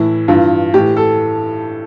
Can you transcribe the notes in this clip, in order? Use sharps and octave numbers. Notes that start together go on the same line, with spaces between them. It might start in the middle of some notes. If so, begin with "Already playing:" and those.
Already playing: A2 E3 E4
G2 E3 F4
A2 E3 G4
A4